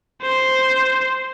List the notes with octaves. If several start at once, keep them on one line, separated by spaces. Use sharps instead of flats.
C5